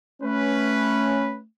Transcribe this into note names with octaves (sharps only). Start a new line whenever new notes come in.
A3 C#4 B4